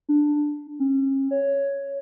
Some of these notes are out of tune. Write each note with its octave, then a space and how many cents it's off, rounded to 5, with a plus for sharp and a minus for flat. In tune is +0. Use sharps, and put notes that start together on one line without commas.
D4 +5
C#4 -40
C#5 +5